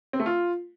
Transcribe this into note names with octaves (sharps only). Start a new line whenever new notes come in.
C4
A3
F4